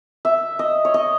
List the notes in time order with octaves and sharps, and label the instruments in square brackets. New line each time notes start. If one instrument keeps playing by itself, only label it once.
[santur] E5
D#5
C#5
D#5